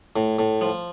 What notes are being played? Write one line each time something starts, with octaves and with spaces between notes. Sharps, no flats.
A2
A2
F3